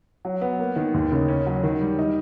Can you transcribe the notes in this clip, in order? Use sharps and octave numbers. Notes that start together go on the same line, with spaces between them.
F#3
B3
A#3
D#3
D#2
C#3
C#4
F#3
D#3
G3
D#4